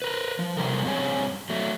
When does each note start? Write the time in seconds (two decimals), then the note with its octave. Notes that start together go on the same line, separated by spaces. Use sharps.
0.02 A#4 B4
0.39 F3
0.57 C3 F3 G3 A4 A#4
0.85 G2 C4 G#4 C#5 G#5
1.50 F#3 A3